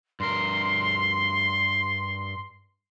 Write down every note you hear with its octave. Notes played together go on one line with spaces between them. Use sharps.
G2 A#4 C6